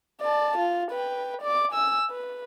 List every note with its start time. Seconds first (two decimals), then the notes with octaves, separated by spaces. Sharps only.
0.21 D5 A5
0.58 F4
0.91 B4 G5
1.41 D5 D6
1.72 G#5 E6
2.10 B4